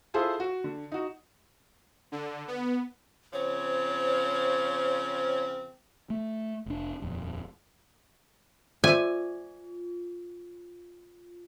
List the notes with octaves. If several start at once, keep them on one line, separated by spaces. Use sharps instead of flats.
E4 F4 G#4 A4 C5
F#4
D3
D#4 F#4
D3
B3
C#3 F3 C4 C#5
A3
F1 D4
D#1 F2
F4 C5 D5 E5 G#5